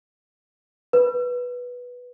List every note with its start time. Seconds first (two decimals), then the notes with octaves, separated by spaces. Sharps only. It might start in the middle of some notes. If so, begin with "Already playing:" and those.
0.93 B4